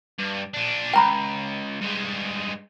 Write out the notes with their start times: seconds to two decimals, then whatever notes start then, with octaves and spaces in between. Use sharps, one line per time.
0.19 G2
0.54 A#2 D4
0.94 C#2 G5 A#5 B5
1.81 G2 G#3